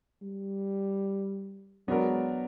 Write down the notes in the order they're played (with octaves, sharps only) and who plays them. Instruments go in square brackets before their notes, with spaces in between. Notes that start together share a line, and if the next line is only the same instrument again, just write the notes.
[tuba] G3
[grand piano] F#3 B3 D4 F#4 A#4 [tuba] G#3